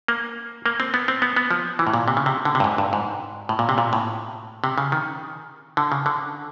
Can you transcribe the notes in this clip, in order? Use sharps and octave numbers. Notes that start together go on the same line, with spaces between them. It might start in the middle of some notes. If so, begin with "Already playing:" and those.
A#3
A#3
C4
B3
C4
B3
B3
F3
E3
A2
A#2
C3
C#3
C3
D3
C3
G2
G#2
G2
G#2
A2
A#2
C3
A#2
A2
C3
C#3
D#3
D3
C#3
D3